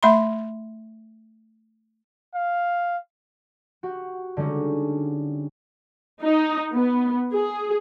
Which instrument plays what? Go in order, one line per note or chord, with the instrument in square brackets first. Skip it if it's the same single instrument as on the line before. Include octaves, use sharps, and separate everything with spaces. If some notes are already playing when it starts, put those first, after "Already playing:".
[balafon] A3 E5 B5 C6
[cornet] F5
[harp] F#4 G4 F#5
D3 G3 G#3 C#4 D#4
[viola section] D#4
B3
G#4